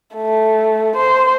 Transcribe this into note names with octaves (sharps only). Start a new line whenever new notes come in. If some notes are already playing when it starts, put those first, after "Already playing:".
A3
C5